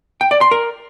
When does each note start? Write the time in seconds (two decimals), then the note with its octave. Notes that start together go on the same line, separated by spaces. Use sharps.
0.21 G5
0.31 D5
0.41 C6
0.51 A#4